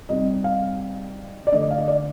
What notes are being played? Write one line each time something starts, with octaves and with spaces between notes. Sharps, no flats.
C3 G3 C4 D#4 D#5
F5
D5
D3 A3 D4 D#5
D5
F5
D#5
D5